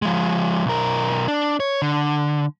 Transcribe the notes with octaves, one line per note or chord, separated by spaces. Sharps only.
F3 G#3
B1 A#4
D4
C#5
D3